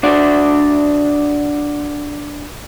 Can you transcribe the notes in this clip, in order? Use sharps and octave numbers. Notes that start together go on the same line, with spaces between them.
D4 F#4 D5